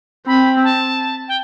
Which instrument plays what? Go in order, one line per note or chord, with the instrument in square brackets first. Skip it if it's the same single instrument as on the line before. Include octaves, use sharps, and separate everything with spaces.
[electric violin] C4 [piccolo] B5
[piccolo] A5
G5